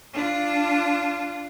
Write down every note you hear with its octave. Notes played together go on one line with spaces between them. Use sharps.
D4 F4